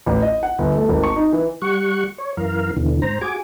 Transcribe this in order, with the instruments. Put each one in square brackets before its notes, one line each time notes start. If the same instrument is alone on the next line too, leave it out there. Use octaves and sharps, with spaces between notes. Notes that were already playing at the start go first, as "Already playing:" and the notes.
[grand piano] A1
D#5
F#5
G1
A3
G#1
C#6
D#4
E3
[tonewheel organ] G3 F#5 C#6
C#5
F#2 E3 A#4 F5
D#2 B2 D3 E3
G#2 C5 A#5
F#4 G#4 G#5 D6